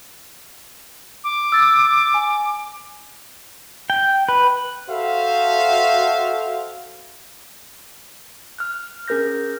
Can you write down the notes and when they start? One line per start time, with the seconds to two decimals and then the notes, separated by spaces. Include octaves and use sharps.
1.23 D6
1.52 E6 A6
2.14 G#5
3.90 G5
4.29 B4
4.90 F#4 A4 C5 E5 F5
8.59 F6 F#6
9.08 C#4 G#4 A#4 F6 G6 A#6